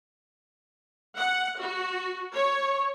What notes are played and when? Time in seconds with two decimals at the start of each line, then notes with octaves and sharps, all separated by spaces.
1.16 F#5
1.59 F#4
2.34 C#5